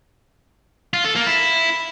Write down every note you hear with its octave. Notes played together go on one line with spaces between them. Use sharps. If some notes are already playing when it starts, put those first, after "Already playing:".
F4
A4
A#3
E4